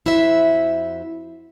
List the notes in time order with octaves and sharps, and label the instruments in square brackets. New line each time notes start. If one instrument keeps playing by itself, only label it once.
[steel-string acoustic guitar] F2 E4 F#4 C5 E5